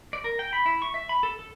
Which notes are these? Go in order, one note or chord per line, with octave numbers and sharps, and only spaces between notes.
D5
A#4
G5
B5
E4
C#6
E5
B5
A4
A4